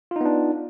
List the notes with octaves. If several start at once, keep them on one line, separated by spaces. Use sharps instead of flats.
B3 D4 D#4 F4